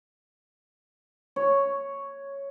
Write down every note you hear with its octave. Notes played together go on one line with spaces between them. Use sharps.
C#5